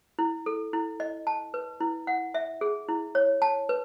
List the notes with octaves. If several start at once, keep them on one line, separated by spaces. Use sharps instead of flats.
E4
A4
E4
D#5
A5
B4
E4
F#5
E5
G#4
E4
C#5
A5
B4